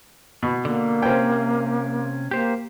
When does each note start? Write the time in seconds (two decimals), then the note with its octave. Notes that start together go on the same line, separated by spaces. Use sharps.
0.43 B2
0.65 D3 A#3
1.02 C3 C4 C#4 G5
2.31 A#3 G4 C5